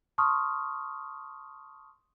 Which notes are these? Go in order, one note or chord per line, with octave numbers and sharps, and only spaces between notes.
A5 C6 C#6 D#6 F6